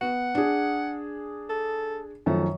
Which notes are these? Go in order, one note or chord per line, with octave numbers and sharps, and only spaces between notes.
B3 F#5
D4 G#4
A4
F#2 D#3 F3 A3